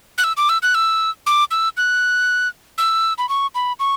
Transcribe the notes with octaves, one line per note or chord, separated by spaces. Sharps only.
F#6
E6
D6
E6
F#6
E6
D6
E6
F#6
E6
B5
C#6
B5
C#6